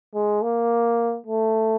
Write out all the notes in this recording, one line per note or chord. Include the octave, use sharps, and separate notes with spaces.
G#3
A#3
A3